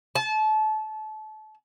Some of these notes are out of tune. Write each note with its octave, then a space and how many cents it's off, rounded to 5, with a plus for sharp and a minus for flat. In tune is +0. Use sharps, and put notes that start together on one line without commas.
A5 -30